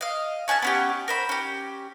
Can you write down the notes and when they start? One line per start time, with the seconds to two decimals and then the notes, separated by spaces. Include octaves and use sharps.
0.01 D#5 F5
0.48 C#4 G#4 F#5 A5
0.62 B3 C#4 G4
1.08 A#4 C5 B5
1.29 C#4 G4